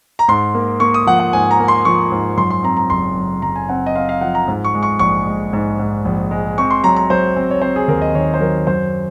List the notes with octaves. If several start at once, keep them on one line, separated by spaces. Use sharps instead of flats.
A#5
G#2 C6
A#3
A#3 C#6
D#6
F3 F#5
F#5
G#2 G#5
A#5
A#3
C6
F3 C#6
G#2
F#2 C6
C6
C4 A#5
A#5
F#1 C6
F#2
F#2 A#5
G#5
C4 F#5
D#5
C4 F5
F5
F3 F#5
A#5
G#2
C#6
G#3
C#6
A#1 C#6
G#3
G#2
G#2
A#1
G#3
C4 C#6
C6
F#3 A#5
A#5
F#3 C5
C4
C#5
C4 C5
G#4
D#2 A#4
D#5
D#3 C#5
C5
F#3 A#4
F#2 C5